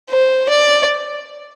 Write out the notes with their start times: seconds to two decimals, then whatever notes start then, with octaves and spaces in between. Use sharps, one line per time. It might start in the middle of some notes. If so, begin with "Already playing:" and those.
0.10 C5
0.49 D5